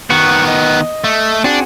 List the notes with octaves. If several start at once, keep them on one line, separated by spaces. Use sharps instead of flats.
D#3 B3 F#4 F#5 C#6
D#5
A3
C4 D4 F#4 G#4